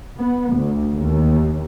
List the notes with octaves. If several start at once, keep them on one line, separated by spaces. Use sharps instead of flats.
B3
D2
D#2